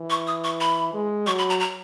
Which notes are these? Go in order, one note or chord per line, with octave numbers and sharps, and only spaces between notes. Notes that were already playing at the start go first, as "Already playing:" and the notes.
Already playing: E3
C#6
D#6
C#6
B5
G#3
F#3 C#6
B5
A#5
A#5